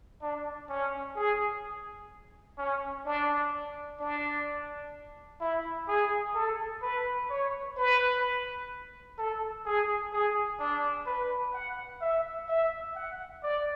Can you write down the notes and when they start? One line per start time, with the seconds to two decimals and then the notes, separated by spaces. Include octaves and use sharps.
0.22 D4
0.69 C#4
1.16 G#4
2.58 C#4
3.05 D4
3.99 D4
5.40 E4
5.88 G#4
6.35 A4
6.82 B4
7.30 C#5
7.77 B4
9.18 A4
9.65 G#4
10.13 G#4
10.59 D4
11.06 B4
11.54 F#5
12.01 E5
12.48 E5
12.95 F#5
13.43 D5